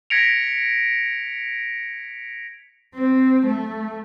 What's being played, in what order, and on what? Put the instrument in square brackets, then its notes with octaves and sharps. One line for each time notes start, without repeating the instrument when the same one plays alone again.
[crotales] G#6 A#6 B6 C#7 D7 F7
[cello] C4
A3